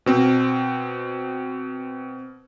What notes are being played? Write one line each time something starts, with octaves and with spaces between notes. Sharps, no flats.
B2 C4